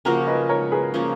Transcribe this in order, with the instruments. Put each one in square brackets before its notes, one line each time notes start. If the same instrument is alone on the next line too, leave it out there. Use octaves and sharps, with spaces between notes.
[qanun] C#3 F3 A#3 C#4 [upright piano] F#4 A#4
[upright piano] B4 D#5
A#4 C#5
G#4 B4
[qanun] C#3 F3 A#3 C#4